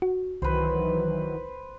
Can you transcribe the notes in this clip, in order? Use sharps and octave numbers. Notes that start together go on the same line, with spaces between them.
F#4
C2 D#3 E3 F#3 B4 C5